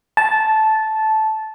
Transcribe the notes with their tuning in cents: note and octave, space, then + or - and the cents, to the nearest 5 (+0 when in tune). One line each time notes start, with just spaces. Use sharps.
A5 -10